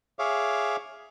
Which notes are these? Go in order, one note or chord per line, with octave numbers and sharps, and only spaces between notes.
G#4 C#5 E5 F5 D6